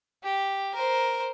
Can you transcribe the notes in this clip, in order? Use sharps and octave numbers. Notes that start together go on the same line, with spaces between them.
G4
A#4 C5